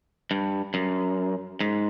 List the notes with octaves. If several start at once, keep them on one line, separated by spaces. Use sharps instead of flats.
G2
F#2
G#2